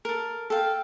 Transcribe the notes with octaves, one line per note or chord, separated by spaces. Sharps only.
A4 A#4
A4 F5 G5